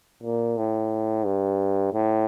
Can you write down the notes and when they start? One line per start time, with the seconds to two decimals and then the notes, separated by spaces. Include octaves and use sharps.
0.23 A#2
0.57 A2
1.26 G2
1.93 A2